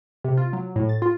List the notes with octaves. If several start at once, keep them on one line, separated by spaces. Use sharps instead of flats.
C3
F4
F#3
A2
A6
F4